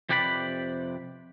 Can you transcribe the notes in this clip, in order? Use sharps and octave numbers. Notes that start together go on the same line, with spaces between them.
F2 C3 G4 B4 D5 B5